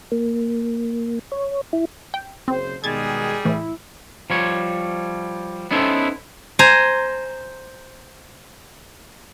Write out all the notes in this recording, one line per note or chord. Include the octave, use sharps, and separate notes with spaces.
A#3
C#5
E4
G5
F#1 C#3 C4 C5
B2 D#3 G3 G#3 G#4 G#6 A6
A2 E3 E4
F3 G3 C#5
B3 C#4 D#4 E4 A4 C5
C5 G#5 A#5